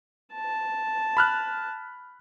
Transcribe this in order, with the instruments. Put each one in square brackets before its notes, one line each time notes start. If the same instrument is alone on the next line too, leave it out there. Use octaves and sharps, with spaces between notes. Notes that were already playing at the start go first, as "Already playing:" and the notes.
[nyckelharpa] A5
[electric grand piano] B5 F6 F#6